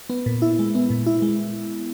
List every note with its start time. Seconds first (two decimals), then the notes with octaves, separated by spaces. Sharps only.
0.10 B3
0.26 A#2
0.42 E4
0.59 G#3
0.75 B3
0.90 A#2
1.06 E4
1.22 G#3